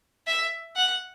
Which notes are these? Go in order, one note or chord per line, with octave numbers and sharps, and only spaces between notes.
E5
F#5